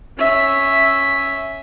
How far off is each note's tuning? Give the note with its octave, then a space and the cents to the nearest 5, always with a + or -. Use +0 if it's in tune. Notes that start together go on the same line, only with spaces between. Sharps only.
C#4 -5 E5 +0